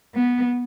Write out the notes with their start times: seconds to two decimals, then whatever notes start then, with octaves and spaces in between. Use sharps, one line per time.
0.15 B3